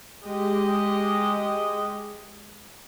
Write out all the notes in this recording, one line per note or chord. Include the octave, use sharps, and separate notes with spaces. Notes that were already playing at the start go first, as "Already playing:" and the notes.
G#3 G4 D#5